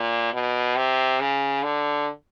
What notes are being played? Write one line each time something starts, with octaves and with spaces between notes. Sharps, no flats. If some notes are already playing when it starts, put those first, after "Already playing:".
Already playing: A#2
B2
C3
C#3
D3